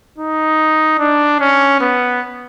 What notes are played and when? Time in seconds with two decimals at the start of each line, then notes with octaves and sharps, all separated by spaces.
0.18 D#4
0.99 D4
1.40 C#4
1.80 B3